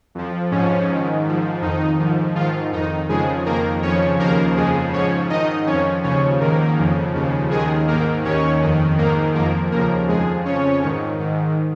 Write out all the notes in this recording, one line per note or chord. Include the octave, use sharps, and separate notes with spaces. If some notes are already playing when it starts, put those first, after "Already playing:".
F2 F3
G#2 F3 C#4
G#2
D#3
G#2 F3
F2 D#3 D#4
G#2 F3
G#2 D#3 F3 F4
F2 D#3 D#4
F2 C#3 F3 G#3 G#4
F2 D#3 A#3 A#4
F2 C#3 F3 C#4 C#5
D#2 C#3 F3 A#3 A#4
F2 C#3 F3 G#3 G#4
G#2 F3 C#4 C#5
G#2 D#3 D#4 D#5
F2 F3 C#4 C#5
D#2 C#3 F3 C#4 C#5
G#2 D#3 A#3 A#4
F2 C#3 F3
D#2 C#3 F3
D#2 D#3 G#3 G#4
G#2 D#3 A#3 A#4
D#2 D#3 C#4 C#5
F2 D#3
G#2 D#3 A#3 A#4
F2 F3 A#3 A#4
D#2 C#3 F3 A#3 A#4
F2 F3 G#3 G#4
F2 C#3 F3 C#4 C#5
G#2 D#3
G#2 D#3